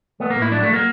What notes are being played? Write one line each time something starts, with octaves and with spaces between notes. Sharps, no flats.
A3 B3
A#3
A2
E4
F#3 D4
A3
F#3 A#3